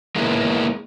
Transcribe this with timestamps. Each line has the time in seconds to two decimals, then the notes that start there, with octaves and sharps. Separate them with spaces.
0.16 G#3 A#3 B3 D#4 E4